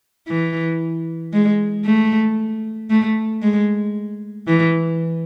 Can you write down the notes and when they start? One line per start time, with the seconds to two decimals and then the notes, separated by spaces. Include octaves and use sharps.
0.28 E3
1.33 G#3
1.85 A3
2.90 A3
3.42 G#3
4.48 E3